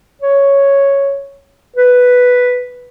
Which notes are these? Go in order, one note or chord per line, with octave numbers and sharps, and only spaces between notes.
C#5
B4